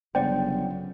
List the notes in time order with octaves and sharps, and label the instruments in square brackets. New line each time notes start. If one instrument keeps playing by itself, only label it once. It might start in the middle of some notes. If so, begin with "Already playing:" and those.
[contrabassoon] G1 [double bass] C#3 F#3 [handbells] C5 D5 F#5 [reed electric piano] G5